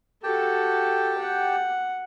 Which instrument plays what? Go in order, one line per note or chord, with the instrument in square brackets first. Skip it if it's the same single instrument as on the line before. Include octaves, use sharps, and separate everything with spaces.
[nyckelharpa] F#4 A4 [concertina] G4 G5 A5
[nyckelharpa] F#5